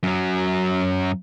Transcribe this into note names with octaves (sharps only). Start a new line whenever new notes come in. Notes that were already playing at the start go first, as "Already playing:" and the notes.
F#2 F#3